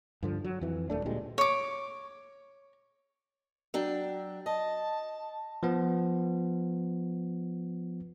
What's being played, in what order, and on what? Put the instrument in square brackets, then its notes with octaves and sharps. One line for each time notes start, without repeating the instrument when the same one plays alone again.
[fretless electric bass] G2 D3 F3
F#3
F2 E3
D#1 A3 D4
D2 A#2 G3 G#3
[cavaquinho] C#5 D6
[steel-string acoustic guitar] F#3 D4 G5
[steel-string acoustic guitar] D#5 [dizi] A5
[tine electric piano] F3 B3